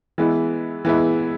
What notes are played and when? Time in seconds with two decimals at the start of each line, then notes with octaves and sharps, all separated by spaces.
0.18 E3 G#3 B3 E4
0.85 E3 G#3 B3 E4